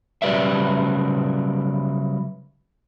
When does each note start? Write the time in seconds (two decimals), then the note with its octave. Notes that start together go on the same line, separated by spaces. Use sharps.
0.22 C#3 F#3 G3 B4 D5 E5